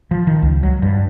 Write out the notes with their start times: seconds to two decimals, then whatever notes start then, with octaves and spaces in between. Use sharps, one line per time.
0.11 F3
0.27 D#3
0.42 C#2
0.63 F#3
0.82 G2